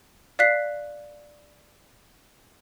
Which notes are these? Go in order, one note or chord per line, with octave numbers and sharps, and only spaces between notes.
D5 F5 F#6 B6 C7